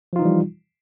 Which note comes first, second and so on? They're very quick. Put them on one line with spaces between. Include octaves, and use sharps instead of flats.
F3 F4 D#4 E3 G3